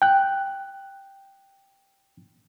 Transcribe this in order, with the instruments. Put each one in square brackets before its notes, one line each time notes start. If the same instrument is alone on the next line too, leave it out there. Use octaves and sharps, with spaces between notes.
[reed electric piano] G5 F#6